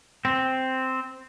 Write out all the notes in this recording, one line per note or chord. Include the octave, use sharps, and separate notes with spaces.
C4